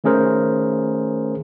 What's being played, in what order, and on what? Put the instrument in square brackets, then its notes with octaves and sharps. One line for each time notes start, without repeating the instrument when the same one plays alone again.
[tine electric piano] D#3 A3 C#4 G#4 A#4 C5